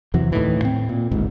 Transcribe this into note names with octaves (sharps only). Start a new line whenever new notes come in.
E2 C3 E3 F#3
D2 A2 D#3 E3
A2 C4
A#2
G1 C#2 G#2